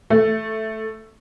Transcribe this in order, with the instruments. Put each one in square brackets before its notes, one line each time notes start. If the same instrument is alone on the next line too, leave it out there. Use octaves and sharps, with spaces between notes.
[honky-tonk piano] A3